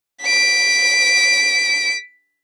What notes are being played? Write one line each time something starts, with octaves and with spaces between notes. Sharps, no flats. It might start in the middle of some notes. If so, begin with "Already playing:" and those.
B6 D7